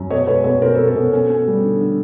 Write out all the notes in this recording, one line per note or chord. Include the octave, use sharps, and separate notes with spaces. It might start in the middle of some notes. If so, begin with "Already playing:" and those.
Already playing: F#2
B2 C#5 D#5
G#3 B4 C#5
B2 B4 C#5
C#4 A#4 C5
A4 B4
B2
A4
B2
C#4 A4
C#4
G3
D3
D3